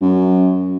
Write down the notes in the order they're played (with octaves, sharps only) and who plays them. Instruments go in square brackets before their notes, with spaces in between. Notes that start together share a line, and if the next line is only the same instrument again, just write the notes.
[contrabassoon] F#2